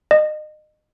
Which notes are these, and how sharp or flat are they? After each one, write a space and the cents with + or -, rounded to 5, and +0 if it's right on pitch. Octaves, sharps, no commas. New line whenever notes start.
D#5 -30